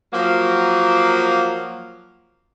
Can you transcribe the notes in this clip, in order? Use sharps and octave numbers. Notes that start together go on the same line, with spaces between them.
F3 F#3 A#3